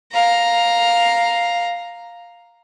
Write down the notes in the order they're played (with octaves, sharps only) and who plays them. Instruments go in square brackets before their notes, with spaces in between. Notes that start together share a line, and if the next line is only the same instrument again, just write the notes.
[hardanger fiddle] F5 A#5